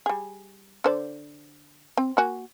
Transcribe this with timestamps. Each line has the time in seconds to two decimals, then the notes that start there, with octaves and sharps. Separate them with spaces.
0.06 G3 G#4
0.84 D3 C5 D5
1.97 C4
2.17 A#3 F#4 G#5